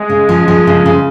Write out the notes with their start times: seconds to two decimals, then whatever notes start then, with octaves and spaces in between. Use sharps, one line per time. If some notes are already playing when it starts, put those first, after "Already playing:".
Already playing: G#3
0.09 C#3
0.29 F3
0.48 F3
0.67 C#3
0.86 C#3